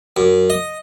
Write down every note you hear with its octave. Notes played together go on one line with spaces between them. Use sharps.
F#2
D#5